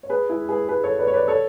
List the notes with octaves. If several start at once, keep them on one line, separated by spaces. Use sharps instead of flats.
C#5
G#4 B4
E4 G#4
G#4 B4
G#4 B4
A4 C#5
B4 D5
C#5
B4 D5
A4 C#5